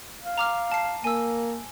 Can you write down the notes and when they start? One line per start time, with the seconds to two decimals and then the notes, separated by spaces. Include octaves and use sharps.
0.23 F5
0.38 A#5 D6 F6
0.72 A5 C7
1.04 A#3 G#5 E6